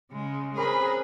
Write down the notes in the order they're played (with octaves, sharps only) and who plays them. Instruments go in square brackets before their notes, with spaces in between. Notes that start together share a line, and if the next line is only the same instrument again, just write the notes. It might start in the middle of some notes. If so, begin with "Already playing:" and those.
[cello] C#3 G#3
[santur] C4 C#4 [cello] G#4 B4 [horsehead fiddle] A#4 [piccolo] B5